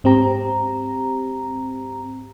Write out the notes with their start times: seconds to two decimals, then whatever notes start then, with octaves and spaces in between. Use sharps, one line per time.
0.04 G#2 C4 G4 A#5